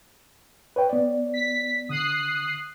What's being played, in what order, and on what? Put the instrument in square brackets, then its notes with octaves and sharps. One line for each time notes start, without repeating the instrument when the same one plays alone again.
[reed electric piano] B4 C#5 G5
B3 C#5 D5
[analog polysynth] B6
[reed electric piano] D3 [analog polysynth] D#6 F#6 C7